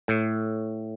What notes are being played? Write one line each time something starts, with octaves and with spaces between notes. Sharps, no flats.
A2